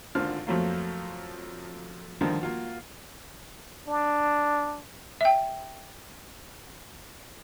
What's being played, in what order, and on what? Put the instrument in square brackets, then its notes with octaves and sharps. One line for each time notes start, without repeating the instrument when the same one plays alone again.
[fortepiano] G#1 D3 F4 C5 F6
F2 F3 F#3 A3 A#3
G2 D3 D#3 F3
A#3 F4 F#4
[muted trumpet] D4
[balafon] E5 G5